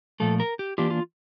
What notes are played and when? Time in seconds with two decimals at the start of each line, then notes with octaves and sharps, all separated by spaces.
0.20 A#2 F3 A3 A4
0.40 A#4
0.59 G4
0.78 E3 A#3 D4 F4 G4
0.90 F4